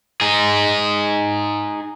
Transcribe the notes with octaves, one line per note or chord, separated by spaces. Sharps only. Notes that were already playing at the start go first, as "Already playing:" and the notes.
D#4 G#4